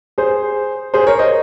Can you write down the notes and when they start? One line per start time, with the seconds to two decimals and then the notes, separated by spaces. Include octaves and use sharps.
0.18 G#4 C5
0.94 G#4 C5
1.07 A#4 C#5
1.19 C5 D#5